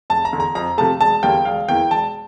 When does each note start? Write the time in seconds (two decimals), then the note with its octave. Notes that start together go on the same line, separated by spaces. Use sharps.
0.10 F1 A5
0.25 A#5
0.33 E2 D3
0.40 A#5
0.55 F2 A#5
0.78 C3 F3 A3 A5
1.01 E1 A5
1.23 E2 D3 G3 A#3 G5
1.45 E1 F5
1.69 E2 E3 A#3 G5
1.91 E1 A5